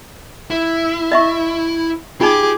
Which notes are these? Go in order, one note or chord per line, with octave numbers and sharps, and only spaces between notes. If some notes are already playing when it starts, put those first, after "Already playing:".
E4
D#5 E5 C#6
D#4 F4 G4 G#4 D6